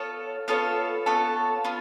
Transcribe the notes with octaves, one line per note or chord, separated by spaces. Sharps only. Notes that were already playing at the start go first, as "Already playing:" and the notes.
Already playing: B3 F4 A4 C#5
B3 F4 A4 C#5
B3 F4 A4 C#5
B3 F4